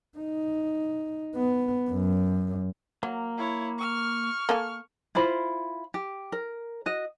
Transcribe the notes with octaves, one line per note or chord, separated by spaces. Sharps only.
D#4
B3
F#2
F#3 A#3
E4 C#5
C#6 F6
A#3 A4 G#5
E4 F4 C5 B5
G4
A#4
F#4 D#5